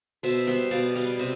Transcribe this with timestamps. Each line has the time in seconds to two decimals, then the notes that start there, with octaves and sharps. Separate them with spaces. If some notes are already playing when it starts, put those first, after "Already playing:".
0.23 B2 C5 E5
0.47 G3 B3 C5 E5
0.71 B2 D5 F5
0.95 G3 B3 D5 F5
1.19 C3 C5 E5